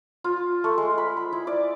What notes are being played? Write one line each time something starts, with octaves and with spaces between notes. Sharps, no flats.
F4
A3
G#3
B5
B5
E4
D5